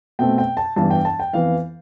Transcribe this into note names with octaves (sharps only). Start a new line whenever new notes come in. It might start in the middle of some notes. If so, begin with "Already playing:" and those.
B2 A3 C4 G5
G5
A5
G2 E3 B3 D4 A5
G5
A5
G5
F2 E3 B3 F5